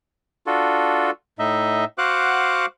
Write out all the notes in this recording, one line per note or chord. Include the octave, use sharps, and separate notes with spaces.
D4 F4 F#4 A4
A2 D#4 D#5 E5
F#4 C5 F5 F#5 D6 F#6